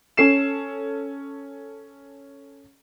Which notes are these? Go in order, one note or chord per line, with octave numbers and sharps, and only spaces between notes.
C#4 A4 C7 E7